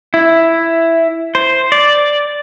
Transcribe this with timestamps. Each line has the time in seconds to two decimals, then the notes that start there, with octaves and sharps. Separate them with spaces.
0.14 E4
1.35 C5
1.72 D5